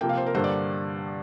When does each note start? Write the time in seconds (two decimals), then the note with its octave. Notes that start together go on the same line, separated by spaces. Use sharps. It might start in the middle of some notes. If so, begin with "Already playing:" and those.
0.01 C3 F3 A#3 G5
0.09 F5
0.17 C5
0.26 A#4
0.35 G2 D3 G3 A#3 C5
0.44 D5